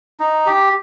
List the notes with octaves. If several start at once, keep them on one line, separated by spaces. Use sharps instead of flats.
D#4
G4